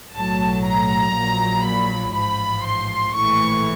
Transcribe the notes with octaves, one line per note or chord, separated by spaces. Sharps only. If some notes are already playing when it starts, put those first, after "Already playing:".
B1 A2 F#3 A5
A#5
A#1 A#2 F#3
B5
A1 G#2 F3 B5
C6
A#1 A2 E3 C#6